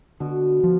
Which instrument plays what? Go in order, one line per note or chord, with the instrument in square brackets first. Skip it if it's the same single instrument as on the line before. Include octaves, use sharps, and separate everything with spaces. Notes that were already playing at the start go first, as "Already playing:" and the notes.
[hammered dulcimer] B2 [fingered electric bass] D3
[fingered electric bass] F3